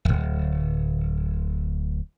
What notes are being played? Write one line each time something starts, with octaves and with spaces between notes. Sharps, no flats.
D1 G#1